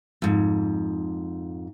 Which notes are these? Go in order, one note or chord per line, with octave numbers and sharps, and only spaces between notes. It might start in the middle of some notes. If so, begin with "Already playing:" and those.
F2 G#2